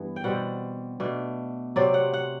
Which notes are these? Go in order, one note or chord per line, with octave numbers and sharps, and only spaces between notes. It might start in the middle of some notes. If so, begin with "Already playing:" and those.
Already playing: G2 E3 B3
G5
B2 G3 C4 F#5
B2 A3 D4
C3 F#3 C4 D5
F#5
F#5